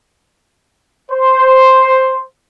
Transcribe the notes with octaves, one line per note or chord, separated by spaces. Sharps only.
C5